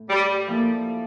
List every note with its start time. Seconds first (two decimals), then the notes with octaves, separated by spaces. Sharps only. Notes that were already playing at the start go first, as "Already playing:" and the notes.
Already playing: A2
0.10 G3
0.47 F3 A#3 E4 A4